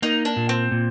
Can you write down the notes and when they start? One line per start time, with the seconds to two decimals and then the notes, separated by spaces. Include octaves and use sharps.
0.02 A#3 D#4
0.25 D4
0.37 A#2
0.49 C4
0.72 A#2